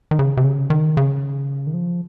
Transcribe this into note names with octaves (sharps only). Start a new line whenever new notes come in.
D#3
C#3
C3
C#3
D#3
C#3
D#3
F3